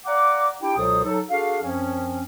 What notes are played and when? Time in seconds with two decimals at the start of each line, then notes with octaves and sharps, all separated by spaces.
0.06 D5 F5 F#5 A#5 D6
0.62 D4 E4 G4 G5
0.76 C#2 B2 F#3 A4 C5 D#6
1.04 F#3 D#4 A4
1.30 D4 F#4 G#4 A4 F5
1.63 F#2 F3 C4 C#4